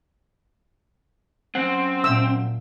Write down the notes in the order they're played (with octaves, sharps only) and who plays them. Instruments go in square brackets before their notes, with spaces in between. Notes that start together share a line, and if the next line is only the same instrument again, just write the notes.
[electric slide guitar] F#2 F#5 [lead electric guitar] C4
[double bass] A#2 [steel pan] E6